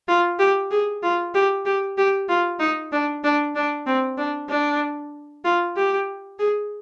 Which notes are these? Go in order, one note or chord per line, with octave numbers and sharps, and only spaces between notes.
F4
G4
G#4
F4
G4
G4
G4
F4
D#4
D4
D4
D4
C4
D4
D4
F4
G4
G#4